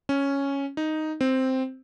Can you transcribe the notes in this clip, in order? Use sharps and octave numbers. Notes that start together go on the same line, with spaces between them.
C#4
D#4
C4